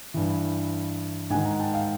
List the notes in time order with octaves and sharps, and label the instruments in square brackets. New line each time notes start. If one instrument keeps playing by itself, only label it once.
[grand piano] G2 E3
G#2 D#3 F#5 G#5
G#5 A#5
G5 A5
F5 G5